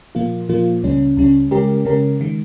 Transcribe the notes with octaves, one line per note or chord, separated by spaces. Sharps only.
A#2 F3 A#3 F4
A#2 F3 A#3 F4
C#2 C#3 G3 C#4
C#2 C#3 G3 C#4
C#3 G#3 C#4 G4 A#4
C#3 G#3 C#4 G4 A#4
D#3 G#3